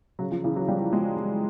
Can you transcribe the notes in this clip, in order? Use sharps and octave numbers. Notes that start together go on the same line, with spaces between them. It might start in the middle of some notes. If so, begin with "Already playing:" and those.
C#3 F#3
F3
C#3 E3
F#3
F3 G3
F3 G#3
G#3